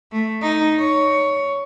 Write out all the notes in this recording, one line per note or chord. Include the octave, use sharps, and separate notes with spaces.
A3
D#4
C#5